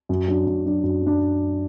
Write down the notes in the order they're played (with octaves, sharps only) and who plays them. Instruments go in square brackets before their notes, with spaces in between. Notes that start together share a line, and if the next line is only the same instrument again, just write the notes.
[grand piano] F#2
F#3 D4
F#2
F#3 D4
F#2
F#3 D4